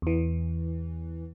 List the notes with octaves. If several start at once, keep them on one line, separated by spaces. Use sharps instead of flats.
E2 E3